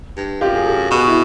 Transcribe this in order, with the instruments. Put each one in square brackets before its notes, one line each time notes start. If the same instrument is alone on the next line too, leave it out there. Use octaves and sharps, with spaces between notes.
[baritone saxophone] G2
[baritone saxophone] F#2 [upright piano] F4 G4
[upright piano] G#4
G4 A4
[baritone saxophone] B2 [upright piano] F#4 G#4
[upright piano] E4